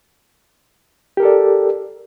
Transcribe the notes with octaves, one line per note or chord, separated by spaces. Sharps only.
G4 A4 A#4 D5